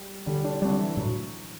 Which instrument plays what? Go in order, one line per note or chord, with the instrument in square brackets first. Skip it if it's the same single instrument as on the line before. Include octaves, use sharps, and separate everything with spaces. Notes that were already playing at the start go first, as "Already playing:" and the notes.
Already playing: [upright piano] G3
[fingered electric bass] D3 [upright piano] G3
[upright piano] D3 D4
[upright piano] D3 D4 [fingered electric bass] G3
[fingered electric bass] C4
[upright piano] E3 E4
[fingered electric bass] A2 [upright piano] F#3